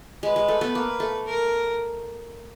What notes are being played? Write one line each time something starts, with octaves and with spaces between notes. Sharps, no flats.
G#3 B4
G#3
A3
A3 B3
A#3
A3
A#4